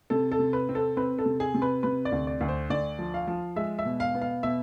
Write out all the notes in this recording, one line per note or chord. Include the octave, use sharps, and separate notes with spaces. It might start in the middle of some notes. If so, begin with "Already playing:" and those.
C3 A4
A4
C3
B4
C4
A4
C4 B4
A4
C3
G#4
C3
B4
C3 B4
D5
D2
D5
D2
C5
D2 D5
F3
F5
F3
G#3 E5
E5
B2
F5
B3
F5
B2 E5